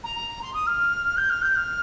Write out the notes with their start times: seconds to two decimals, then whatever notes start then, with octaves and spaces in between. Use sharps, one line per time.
0.03 A#5
0.42 C6
0.53 D#6
0.66 F6
1.17 G6
1.29 F6
1.41 G6
1.55 F6